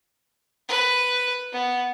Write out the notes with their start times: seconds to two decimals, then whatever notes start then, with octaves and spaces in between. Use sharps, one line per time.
0.69 B4
1.53 B3